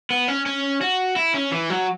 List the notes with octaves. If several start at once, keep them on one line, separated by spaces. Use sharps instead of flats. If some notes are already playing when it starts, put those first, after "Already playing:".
B3
C#4
C#4
F#4
E4
C#4
E3
F#3